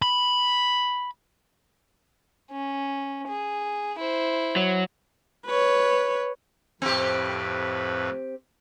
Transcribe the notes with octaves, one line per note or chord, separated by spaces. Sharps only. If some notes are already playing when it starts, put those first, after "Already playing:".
B5
C#4
G#4
E4 C5
F#3
B4 C#5
F2 A2 C4 G4 B4